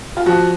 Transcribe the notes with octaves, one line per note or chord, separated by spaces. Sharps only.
F4
F3 F#4